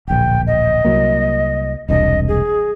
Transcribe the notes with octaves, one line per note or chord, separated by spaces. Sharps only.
D1 A#1 G5
D#5
C2 F#3 A#3
E1 C2 D4 D#5
G#4